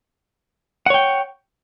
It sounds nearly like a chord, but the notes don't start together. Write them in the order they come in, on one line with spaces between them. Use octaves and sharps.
F#5 C#5 G5